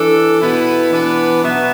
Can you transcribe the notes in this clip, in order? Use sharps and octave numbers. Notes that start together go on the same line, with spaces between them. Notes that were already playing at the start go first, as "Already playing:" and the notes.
Already playing: E3 D4 A4
B2 B3 E4 B4
E3 B3 D4
B2 F#3 B3 E5